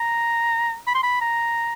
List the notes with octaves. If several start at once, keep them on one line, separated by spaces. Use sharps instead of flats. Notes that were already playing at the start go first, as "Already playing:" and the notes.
Already playing: A#5
B5
C6
B5
A#5